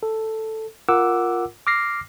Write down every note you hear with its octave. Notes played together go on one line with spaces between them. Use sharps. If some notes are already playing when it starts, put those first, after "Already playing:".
A4
F4 A#4 F#5 D6 E6
D6 F6 A#6 C7